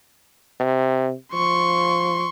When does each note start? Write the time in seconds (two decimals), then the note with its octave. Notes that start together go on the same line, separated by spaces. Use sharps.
0.60 C3
1.33 F3 C6 C#6